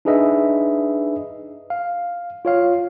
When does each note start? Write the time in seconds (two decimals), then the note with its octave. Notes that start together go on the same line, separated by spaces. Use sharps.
0.05 D4 D#4 G#4 B4 D#5 E5
1.70 F5
2.45 F4 C#5 F5